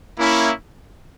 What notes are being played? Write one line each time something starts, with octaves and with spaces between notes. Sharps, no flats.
A#3 C#4 E4